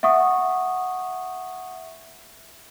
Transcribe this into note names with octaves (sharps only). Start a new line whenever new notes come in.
E5 F#5 C#6 D#6